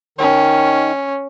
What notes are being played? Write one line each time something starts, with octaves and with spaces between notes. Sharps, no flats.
D#3 C#4